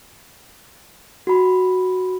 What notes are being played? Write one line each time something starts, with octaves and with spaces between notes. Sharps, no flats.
F#4 B5